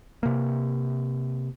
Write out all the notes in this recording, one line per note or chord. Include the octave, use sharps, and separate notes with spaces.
C3 A#3